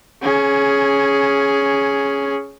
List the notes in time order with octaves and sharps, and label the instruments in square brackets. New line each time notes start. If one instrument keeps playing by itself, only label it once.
[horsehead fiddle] C#4 G#4